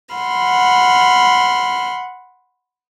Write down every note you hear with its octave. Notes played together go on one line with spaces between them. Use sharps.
F#5 B5 C6 F6